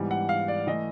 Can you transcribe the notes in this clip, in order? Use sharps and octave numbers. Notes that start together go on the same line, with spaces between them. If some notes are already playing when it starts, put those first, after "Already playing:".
Already playing: G#2 E3 G3 B3
F#5
F5
D5
E3 A3 D#5